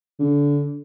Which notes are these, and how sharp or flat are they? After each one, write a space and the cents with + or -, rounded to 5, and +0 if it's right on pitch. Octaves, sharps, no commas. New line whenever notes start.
D3 -25